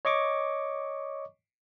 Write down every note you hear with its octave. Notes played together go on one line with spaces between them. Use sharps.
C#5 D#5 C#6 D6